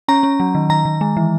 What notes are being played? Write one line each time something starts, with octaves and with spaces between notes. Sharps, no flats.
C#4 A#5
C#4
F#3
D#3
D#3 A#5
D#3
G#3
E3